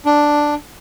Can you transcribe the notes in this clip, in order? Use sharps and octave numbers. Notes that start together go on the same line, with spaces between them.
D4